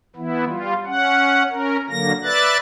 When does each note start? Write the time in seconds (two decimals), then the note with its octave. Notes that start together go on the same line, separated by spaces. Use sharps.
0.16 E3 B3 E4
0.48 G3 F4
0.86 C#4 F#5
1.50 C#4 A#4
1.90 D3 F#3 A#3 A#6
2.24 B4 D5 E5 F#6 A6